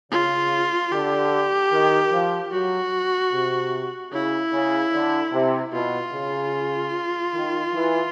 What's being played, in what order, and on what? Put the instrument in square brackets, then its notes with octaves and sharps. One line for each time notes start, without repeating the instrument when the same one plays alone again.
[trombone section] C#3 [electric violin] F4
[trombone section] D3 [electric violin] G4
[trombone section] D#3
F3
[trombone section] F#3 [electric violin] F#4
[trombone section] C3
[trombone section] C#3 [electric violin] E4
[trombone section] C#3
D3
C3
[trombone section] B2 [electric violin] F4
[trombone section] C#3
D#3
E3